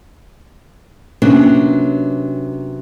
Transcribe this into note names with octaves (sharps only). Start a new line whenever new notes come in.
C3 F#3 A#3 B3 C#4 D4